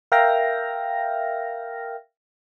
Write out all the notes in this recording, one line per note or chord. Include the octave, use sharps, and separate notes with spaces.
A#4 E5 F5 G5 F6 A#6